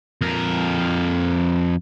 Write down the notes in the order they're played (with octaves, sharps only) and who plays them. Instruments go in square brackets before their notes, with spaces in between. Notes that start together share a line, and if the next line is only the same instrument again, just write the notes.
[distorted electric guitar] F2 A#4